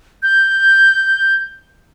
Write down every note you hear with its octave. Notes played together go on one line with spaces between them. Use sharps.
G6